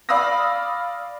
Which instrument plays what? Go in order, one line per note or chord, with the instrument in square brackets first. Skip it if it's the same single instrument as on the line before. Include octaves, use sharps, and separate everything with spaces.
[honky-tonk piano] D5 F5 B5 D#6 E6 A#6